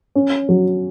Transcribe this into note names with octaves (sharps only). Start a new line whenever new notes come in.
C#4
F#3